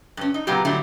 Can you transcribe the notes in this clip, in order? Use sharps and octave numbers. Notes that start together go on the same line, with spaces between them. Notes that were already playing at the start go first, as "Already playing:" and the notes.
G2 C#4
D#4
A#2 C#3 F#3 B3 F4 G4
A2 D3 F#3 G3 E4